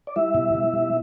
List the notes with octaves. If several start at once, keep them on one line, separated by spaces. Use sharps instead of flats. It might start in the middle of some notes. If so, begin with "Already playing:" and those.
D5
G3 E4 E5
B2
B2
G3